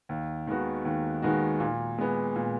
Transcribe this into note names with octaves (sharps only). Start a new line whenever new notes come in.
D#2
D#3 G#3 B3 F#4
D#2
D#3 G#3 B3 F#4
A#2
G#3 B3
A#2